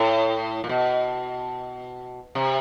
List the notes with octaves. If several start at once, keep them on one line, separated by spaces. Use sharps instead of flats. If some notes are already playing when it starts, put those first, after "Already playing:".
Already playing: A2
A#2
B2
C3